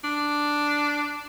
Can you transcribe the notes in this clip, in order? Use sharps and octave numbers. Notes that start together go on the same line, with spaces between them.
D4